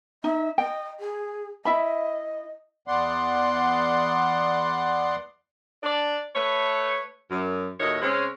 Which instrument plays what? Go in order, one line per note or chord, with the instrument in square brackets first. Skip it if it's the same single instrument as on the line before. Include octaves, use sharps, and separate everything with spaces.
[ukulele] D#4 [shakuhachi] E5
[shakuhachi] D#5 [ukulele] G5
[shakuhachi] G#4
[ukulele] E4 E5 B5 [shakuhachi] D#5
[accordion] E2 B3 D5 F#5 C6
[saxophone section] D4 D5
A3 B4 C#5
F#2
D#2 A2 D#3 F#4 C#5 D#5
C#3 G#3 C4 C#4